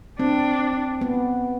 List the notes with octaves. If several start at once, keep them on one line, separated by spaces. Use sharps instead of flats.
C4 D4
B3